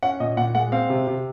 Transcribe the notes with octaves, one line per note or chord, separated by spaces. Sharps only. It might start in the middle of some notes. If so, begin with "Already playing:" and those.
C#4 F#5
A#2 D#5
A#2 F#5
G#3 F#5
C4 F5
C3
C3